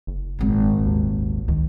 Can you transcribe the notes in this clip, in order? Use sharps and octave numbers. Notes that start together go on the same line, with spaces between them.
F#1
D#1 G#1
D#2
C#2 D#3